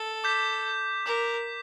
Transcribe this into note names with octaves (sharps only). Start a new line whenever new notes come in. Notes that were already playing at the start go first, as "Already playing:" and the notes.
Already playing: A4
D6 G6 B6
A#4 D6 G6 B6